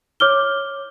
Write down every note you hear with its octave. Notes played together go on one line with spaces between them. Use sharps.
C#5 D6 F6 G7